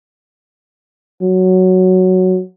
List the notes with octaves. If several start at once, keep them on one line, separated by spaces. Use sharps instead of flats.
F#3